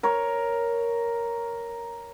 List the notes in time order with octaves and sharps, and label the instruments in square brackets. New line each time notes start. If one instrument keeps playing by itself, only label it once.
[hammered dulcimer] A#4 C#5